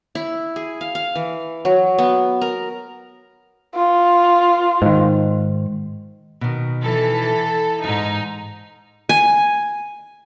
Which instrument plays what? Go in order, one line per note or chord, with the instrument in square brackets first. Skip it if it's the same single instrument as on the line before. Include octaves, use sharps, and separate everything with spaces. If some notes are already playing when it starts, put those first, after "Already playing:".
[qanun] E4
G#4
F5
F5
E3
F#3
B3
A#4
[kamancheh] F4
[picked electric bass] G#2 D#3
[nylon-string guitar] B2 D#3
[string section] E3 A4
[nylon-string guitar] F2 G#2 [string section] D#4
[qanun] G#5